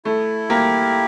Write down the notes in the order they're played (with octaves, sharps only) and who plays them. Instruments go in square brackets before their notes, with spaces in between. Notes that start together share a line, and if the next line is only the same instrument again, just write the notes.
[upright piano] A3 [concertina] E4
[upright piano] A#3 [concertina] G4